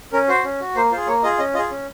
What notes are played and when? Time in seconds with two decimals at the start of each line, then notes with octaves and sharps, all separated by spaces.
0.13 C#4 A#4
0.28 F#4 C5
0.44 C#4
0.61 F#4
0.76 A#3 C5
0.92 F4 G#4 C5
1.07 A#3 C#5
1.23 F4 G#4 D#5
1.39 C#4 D#5
1.54 F4 D#5
1.58 G#4
1.71 C#4